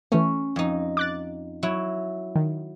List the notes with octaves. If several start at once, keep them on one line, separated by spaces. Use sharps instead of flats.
E3 A3 C#4
F2 D#4
D6 F#6 A6
F#3 E4
D#3